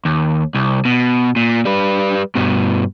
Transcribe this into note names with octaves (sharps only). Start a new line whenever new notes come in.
D#2
C2
B2
A#2
G3 B4
G2 B2